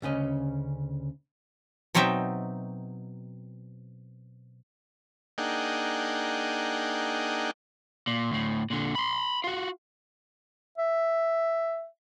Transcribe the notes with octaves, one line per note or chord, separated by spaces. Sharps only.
D2 C#3 C#4 D#5
B2 F#3 C4 D#4 E5 G5
A#3 D4 D#4 G#4 F#5 G5
A#2
D2 A2
A#2 D3
B5 C6
F4 F#4
E5